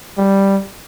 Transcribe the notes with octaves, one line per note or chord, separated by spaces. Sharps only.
G3